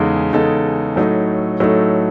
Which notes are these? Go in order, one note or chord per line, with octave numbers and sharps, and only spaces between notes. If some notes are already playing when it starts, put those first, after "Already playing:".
Already playing: E2 C#3 G#3 D#4 A4
E2 C#3 G#3 D#4 A4
A2 F#3 A3 D#4 A4
A2 F#3 A3 D#4 A4